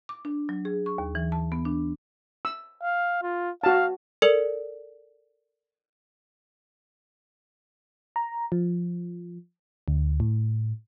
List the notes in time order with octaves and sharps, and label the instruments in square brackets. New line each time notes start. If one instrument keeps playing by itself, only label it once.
[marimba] D6
D4
F#3
G#4
C#6
D#2
E3
A5
B3
D4
[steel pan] E6
[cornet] F5
F4
[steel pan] F#4 A5 [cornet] F5
[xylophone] A4 A#4 D5 C#7 F#7
[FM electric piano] A#5
F3
D2
A2